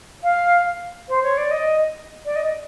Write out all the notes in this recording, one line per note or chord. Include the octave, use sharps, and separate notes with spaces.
F5
C5
C#5
D5
D#5
D5
D#5